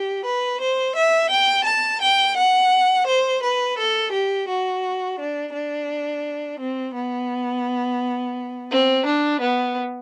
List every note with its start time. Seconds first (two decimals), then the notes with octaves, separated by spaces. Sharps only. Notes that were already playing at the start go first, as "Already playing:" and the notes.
Already playing: G4
0.24 B4
0.60 C5
0.95 E5
1.30 G5
1.65 A5
2.00 G5
2.36 F#5
3.06 C5
3.42 B4
3.77 A4
4.12 G4
4.48 F#4
5.18 D4
5.52 D4
6.58 C4
6.93 B3
8.70 C4
9.05 D4
9.40 B3